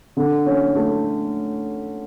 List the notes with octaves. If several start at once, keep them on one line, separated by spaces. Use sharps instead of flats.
D3
C#4
A3